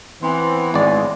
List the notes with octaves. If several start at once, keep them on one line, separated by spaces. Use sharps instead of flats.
E3 B3 C4 C5
G#1 A2 G#3 B3 D5